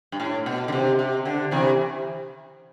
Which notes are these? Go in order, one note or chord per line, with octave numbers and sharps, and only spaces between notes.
G2
A2
B2
D3
C3
C3
D3
C3 E3